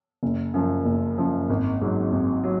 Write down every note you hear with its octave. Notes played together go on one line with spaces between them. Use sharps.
F#1
F#2 F3
F#1
F#2 F3
G#1
G#2 F#3
G#1
F#3